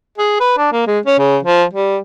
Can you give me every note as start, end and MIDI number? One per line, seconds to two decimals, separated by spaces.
0.18 0.38 68
0.40 0.54 71
0.58 0.72 62
0.72 0.83 58
0.87 0.99 56
1.06 1.18 61
1.19 1.37 49
1.43 1.64 53
1.74 1.97 55